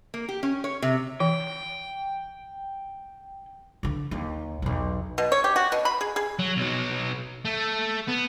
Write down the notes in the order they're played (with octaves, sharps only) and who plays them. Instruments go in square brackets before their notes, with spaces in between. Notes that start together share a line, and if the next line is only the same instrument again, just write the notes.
[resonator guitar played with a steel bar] A#3
G4
C#4
C#5
C3
[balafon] E3 [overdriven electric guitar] G5
[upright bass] D3 E3
D#2
B1 E2
[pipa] B2
C#5
G4
F#4
B2
B5
G#4
G#4
[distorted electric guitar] F#3
B1 F#3
A3
B3